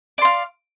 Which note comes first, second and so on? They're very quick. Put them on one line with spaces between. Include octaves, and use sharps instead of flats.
D5 C6 F5